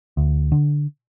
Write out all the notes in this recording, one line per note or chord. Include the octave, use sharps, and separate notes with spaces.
D2
D3